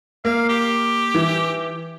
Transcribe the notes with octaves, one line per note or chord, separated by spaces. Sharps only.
A#3 F5
G4
E3